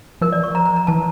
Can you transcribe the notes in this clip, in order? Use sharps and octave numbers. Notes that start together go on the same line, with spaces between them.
F3 A#4
E3 D5
F3 C#6
A#5
A#5
A#5
E3 A5